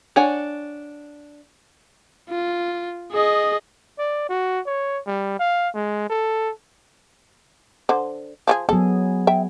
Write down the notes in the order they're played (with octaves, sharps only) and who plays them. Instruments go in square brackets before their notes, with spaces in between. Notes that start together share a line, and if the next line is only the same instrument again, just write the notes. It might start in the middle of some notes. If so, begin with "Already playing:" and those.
[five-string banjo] D4 C#5 F#5 G#5
[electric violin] F4
G#4 D#5
[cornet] D5
F#4
C#5
G3
F5
G#3
A4
[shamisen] D3 C5
F3 F4 G#4
[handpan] F#3 B3 G#4 [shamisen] A4
[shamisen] E5 G5